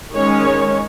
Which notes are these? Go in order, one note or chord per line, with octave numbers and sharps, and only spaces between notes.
D#3 G#3 C#4 C#5